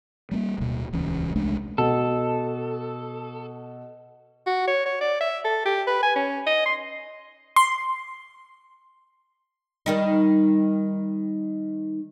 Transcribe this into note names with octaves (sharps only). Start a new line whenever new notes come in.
G3 A3 A#3
D1 B2
D#1 C#2 E3 C#4
C2 G#3 A3 D4
B2 A4
F#4
C#5
C#5
D5
E5
A4
G4
B4
G#5
C#4
D#5
C6
C6
D#3 G3 D#4